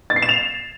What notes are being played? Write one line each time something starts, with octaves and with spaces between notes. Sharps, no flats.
A6
C7
E7
F7